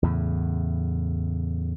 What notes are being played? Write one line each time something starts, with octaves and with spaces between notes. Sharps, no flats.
E2 A2 C#3